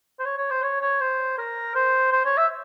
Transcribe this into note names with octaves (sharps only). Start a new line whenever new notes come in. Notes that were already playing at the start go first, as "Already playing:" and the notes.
C5
C#5
C#5
C5
C#5
C#5
C5
A#4
C5
C5
C#5
E5